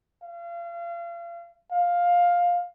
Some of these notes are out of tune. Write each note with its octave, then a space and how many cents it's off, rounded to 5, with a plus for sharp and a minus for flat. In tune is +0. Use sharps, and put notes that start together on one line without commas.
F5 -35
F5 +10